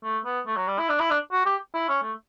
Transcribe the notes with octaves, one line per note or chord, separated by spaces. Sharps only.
A3
B3
A3
F#3
G3
E4
D4
E4
D4
F#4
G4
E4
C#4
A3